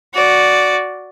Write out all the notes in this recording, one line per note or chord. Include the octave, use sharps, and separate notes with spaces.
F#4 D5